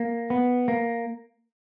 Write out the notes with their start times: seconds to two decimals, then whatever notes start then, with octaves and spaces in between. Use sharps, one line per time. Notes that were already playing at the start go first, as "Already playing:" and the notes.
Already playing: A#3
0.30 B3
0.68 A#3